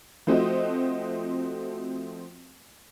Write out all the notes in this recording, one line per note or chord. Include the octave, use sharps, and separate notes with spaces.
F3 A3 C4 F#4 D#5